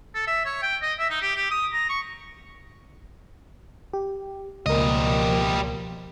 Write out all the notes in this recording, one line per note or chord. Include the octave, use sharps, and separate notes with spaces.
A4
E5
C#5
G5
D#5
E5
D#4
G4
G4
D#6
A#5
C#6
G4
C#2 B2 F3 G3 A#3 A#4 D#5